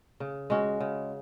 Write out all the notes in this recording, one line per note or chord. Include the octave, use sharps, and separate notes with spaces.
C#3
G#3 C#4 F#4
C#3